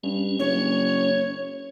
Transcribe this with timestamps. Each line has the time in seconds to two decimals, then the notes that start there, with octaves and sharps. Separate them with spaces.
0.04 G2 C#4
0.39 F#1 C#5